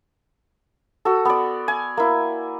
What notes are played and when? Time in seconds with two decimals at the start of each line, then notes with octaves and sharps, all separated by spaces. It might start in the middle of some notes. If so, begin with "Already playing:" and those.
1.05 F#4 A4
1.25 B3 D5
1.68 G#5
1.97 A#3 E4